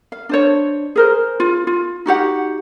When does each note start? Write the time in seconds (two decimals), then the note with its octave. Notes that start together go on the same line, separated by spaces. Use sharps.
0.12 F5
0.29 D4 C5 C#5
0.96 G#4 A#4 C5
1.40 F4
1.67 F4
2.06 D#4 F#4 G4 F#5